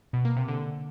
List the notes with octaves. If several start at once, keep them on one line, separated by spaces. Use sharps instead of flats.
B2
A#3
C3
D3